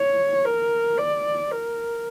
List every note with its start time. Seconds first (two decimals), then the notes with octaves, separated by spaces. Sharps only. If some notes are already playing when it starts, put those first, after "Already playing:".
Already playing: C#5
0.45 A#4
0.98 D5
1.51 A#4